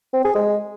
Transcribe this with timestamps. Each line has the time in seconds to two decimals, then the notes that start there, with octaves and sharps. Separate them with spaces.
0.13 C4
0.24 G#4
0.35 G#3